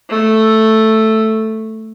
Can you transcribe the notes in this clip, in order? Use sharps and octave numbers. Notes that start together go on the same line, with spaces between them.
A3